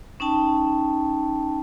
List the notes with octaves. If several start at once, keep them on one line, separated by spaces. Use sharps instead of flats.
C#4 D#4 G5 A5